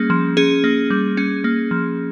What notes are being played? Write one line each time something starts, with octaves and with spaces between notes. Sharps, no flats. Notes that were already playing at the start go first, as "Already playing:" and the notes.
Already playing: G3 A#3 C#4 G#4
F3
C#4 G#4
A#3
G3
C#4
A#3
F3